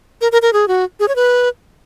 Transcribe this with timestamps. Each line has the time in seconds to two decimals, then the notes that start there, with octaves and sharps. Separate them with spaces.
0.21 A#4
0.32 A#4
0.42 A#4
0.53 G#4
0.68 F#4
1.00 G#4
1.08 C#5
1.16 B4